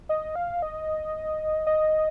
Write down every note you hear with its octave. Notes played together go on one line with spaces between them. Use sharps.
D#5
F5
D#5
D#5